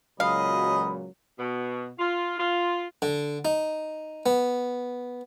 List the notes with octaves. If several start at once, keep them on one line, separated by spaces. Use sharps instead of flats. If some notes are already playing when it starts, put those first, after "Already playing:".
C#2 A#2 F#3 G#4 D#5 F5 B5
B2
F4
F4
D3
D#4
B3